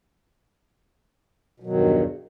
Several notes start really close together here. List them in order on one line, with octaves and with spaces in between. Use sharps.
B2 F#3 D#3 G2 E2